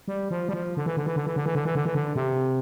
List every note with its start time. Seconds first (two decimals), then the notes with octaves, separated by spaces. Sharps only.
0.08 G3
0.31 F3
0.49 G3
0.53 F3
0.77 D3
0.86 E3
0.97 D3
1.06 E3
1.16 D3
1.26 E3
1.36 D3
1.46 E3
1.55 D3
1.65 E3
1.75 D3
1.85 E3
1.95 D3
2.15 C3